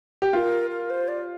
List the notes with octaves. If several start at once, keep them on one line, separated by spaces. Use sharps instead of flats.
G4
F4 A#4
A#4
C5
D5